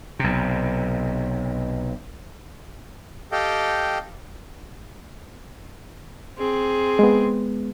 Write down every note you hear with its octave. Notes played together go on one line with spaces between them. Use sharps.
B1 C3
G4 A4 D#5 F5 G5
C4 G#4
G#3 B3